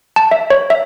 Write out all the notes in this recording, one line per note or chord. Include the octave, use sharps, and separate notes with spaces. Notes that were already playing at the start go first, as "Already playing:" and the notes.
A5
E5
C#5
E5